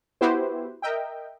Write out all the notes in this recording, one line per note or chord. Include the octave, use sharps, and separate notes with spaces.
B3 E4 F#4 G4 B4 C5
A#4 D#5 E5 G5